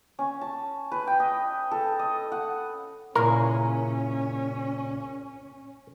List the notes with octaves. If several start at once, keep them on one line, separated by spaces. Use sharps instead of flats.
C#4
A5
B4
G5
D#5
A4
D#5
F#5
A#2 C#3 C#4 E4 A#4